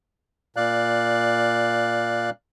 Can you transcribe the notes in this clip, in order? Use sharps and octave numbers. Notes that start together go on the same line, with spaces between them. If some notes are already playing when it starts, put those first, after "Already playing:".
A#2 D5 F5 F#6